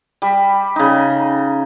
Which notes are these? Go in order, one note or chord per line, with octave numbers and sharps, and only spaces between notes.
G3
C#3 D#4